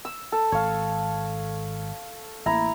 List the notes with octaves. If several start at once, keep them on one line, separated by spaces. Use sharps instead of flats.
E6
A4
G#1 C#5 F5
A1 A#3 E4 A#5